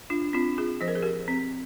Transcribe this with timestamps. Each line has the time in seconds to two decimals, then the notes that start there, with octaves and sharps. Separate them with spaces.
0.10 D4 F4
0.33 C4 D4 F4
0.58 F4 G#4
0.81 F3 C5
0.88 A#4
0.95 G#4
1.02 G4 A#4
1.28 C4